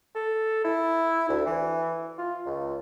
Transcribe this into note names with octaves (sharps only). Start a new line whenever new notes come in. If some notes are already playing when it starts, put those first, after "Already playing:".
A4
E4
D2
E3
F4
C#2